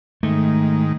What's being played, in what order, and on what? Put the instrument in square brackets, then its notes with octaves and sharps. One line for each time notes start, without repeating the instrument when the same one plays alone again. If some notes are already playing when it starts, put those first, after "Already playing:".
[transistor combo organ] G#2 D#3 [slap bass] A3